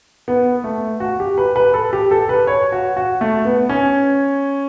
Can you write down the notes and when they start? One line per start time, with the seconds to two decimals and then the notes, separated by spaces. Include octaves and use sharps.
0.28 B3
0.64 A3
1.00 F#4
1.20 G4
1.38 B4
1.56 B4
1.74 A4
1.93 G4
2.11 A4
2.29 B4
2.47 C#5
2.72 F#4
2.97 F#4
3.21 A3
3.45 B3
3.69 C#4